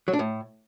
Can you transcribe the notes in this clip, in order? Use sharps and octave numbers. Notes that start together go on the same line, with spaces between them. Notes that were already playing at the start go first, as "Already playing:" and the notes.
F#3
D4
A2